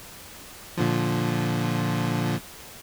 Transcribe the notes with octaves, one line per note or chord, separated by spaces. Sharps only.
A#2 D3 F3